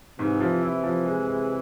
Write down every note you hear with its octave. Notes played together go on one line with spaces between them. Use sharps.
G#2 C3 E3
F3
E4
F3
G#3
G#3